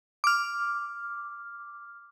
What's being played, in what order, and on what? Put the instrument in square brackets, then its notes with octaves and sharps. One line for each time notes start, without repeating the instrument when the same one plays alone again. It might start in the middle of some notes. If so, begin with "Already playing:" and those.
[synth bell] D6 F6